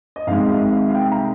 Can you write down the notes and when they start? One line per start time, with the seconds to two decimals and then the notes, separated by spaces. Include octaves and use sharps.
0.16 D#5
0.27 C2 C3 D#3 G#3 F5
0.49 D#5
0.72 F5
0.89 F5
0.95 G5
1.12 A#5